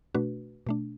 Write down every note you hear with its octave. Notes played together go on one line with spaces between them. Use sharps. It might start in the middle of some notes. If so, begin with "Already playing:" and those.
B2 A3 D4 F#4 B4
B2 A3 D4